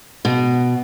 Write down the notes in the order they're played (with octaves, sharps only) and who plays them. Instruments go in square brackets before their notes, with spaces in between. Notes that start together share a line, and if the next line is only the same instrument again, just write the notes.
[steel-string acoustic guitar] B2